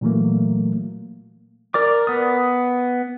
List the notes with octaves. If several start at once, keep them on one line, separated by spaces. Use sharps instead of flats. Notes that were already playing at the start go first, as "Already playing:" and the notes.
A#2 E3 F#3 A3 A#3
A#4 D5 D6
B3 D#6